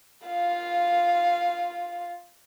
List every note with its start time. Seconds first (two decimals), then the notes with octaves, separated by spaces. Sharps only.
0.25 F4 F5